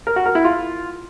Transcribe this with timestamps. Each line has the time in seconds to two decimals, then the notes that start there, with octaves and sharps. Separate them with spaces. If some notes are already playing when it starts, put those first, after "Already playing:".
0.07 A#4
0.16 F#4
0.26 A#4
0.35 E4
0.45 F4